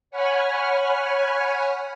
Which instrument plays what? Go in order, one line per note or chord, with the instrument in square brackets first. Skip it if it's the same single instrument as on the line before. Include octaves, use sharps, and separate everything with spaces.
[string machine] C#5 F#5 G#5 B5 F6